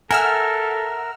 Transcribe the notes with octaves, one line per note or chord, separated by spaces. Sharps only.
A4 A#4 E5 F#5 G#5 E6 F6